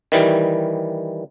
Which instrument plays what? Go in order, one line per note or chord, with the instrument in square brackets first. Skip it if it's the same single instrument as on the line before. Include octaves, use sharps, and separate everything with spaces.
[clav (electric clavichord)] D#3 E3 G3